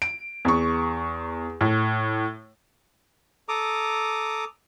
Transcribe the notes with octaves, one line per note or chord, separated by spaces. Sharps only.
D7
E2 C#6
A2
A4 A#5 D6 D#6